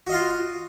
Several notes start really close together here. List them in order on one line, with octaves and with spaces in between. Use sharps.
F#4 D#5 F5 F4